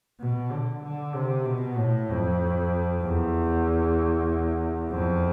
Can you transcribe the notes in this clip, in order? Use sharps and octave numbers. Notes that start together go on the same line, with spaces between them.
B2
D3
D3
C3
B2
A2
F2
E2
F2